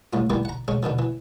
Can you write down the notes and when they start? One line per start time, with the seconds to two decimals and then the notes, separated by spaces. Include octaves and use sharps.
0.13 C2 A2 F4
0.30 D#3 E3 G3 A#3 B3
0.45 F#5 A#5
0.68 C#3 G#3 C#4
0.83 B2 D3 D#3 F3
0.99 E3